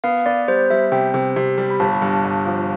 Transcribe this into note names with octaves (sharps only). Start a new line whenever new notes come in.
B3 F5
B3 D5
G3 C5
G3 E5
C3 G5
C3
C3
G3
B5
G1 A5
G2
G2
F3